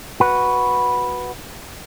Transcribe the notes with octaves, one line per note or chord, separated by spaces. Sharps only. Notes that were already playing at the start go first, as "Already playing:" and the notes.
F#4 B4